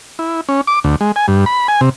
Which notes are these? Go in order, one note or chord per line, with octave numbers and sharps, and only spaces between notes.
E4
C#4
D6
D2
G#3
G#5
G2
B5
G#5
C3